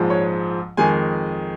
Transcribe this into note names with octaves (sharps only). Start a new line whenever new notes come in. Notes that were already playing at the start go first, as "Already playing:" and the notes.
Already playing: A#1 G#2 F3 G#3
C#5
F2 D#3 G#3 G#5